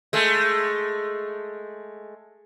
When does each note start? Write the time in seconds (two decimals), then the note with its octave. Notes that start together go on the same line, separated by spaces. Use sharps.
0.13 G#3 A3